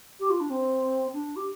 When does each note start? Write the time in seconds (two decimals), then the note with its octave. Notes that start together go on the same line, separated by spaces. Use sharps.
0.19 G4
0.29 F4
0.40 D4
0.49 C4
1.13 D4
1.35 G4